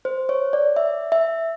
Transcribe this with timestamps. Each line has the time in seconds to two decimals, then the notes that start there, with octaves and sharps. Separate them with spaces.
0.05 C5
0.29 C#5
0.53 D5
0.76 E5
1.12 E5